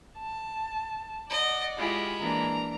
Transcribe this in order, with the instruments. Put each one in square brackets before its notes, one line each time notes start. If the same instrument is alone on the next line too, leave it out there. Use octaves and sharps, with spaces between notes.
[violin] A5
[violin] D5 F#5 [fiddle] D#5
[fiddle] G#3 B5 [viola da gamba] E4 F4 G4
[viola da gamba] E3 A#3 D4 [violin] A#5